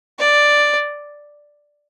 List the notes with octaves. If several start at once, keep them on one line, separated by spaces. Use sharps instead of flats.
D5